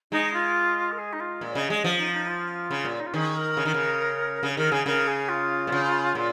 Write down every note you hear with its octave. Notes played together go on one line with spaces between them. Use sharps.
G#3 D#4
F4
A#4
G#4
D#4
F4
A#2
C#5
C#3 D#5
G#3 D#5
F3
D#4
D#4
F4
C#3
A#2
D#4
F4
D#3 G#4
A#4
C#3
D#3
C#3
C#3
D#3 A#4
C#3 G#4
C#3 A#4
G#4
F4
A#2
C#3
A#2